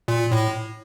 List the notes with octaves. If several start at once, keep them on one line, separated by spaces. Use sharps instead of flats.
A#2
A2